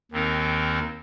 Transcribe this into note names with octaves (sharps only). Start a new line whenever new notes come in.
D#2 D#3 C4 D#4 A#4